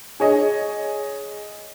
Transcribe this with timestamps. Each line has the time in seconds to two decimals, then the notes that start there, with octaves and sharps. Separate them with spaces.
0.20 G#4 C#5 D#5